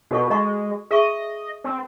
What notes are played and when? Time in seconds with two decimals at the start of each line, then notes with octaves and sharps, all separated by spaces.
0.11 B2 F#4 A4 C#6
0.30 G#3 D#5 A#5 C#6
0.91 G#4 D#5 E5 C#6
1.64 C4